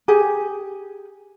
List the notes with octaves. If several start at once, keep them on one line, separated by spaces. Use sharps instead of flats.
G4 G#4